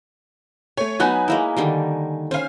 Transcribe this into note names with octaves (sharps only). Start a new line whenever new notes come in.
A3 C#5 G#5
F#3 B3 D#4 G#5 B5 F#6
G#3 A#3 E4
D3 D#3 G3
C#4 C5 F5 G#5